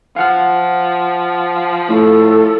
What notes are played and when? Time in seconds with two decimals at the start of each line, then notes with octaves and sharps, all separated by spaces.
0.16 F3 F5 F#5 F6
1.89 A2 A4